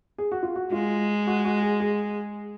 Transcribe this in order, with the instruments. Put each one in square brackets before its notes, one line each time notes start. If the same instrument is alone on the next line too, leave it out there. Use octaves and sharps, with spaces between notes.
[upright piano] G#4
F#4
F4
F#4
[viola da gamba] G#3 [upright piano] F4
[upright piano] F#4
F#4
G#4
G#4